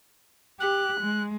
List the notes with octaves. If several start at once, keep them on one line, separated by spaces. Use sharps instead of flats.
G4 F#6
G#3